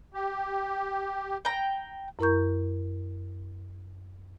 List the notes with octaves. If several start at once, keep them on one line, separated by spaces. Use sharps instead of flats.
G4
G5 A#5
F#2 E4 A#4 A#5 C#6 G6